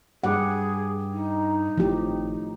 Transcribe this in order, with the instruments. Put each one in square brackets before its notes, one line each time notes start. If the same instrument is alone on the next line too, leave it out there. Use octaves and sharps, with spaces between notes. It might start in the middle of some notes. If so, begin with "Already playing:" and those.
[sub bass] G2 [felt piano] G3 D6 [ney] G#4 [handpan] F#5
[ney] D#4
[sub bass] G#1 [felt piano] A2 [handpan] F3 G4